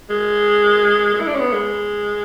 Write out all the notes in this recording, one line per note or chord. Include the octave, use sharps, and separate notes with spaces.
G#3
G#3
E4
D4
C#4
B3
G#3